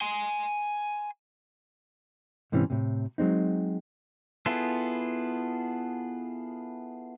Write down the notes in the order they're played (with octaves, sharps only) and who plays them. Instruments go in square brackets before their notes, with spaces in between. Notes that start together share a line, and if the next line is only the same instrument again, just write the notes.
[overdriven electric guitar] G#5 C6
[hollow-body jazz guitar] G#2 C3 E3 C#4
A2 C3
F#3 G#3 C4 D#4
[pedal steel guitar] B3 E4 F4 G#4 A4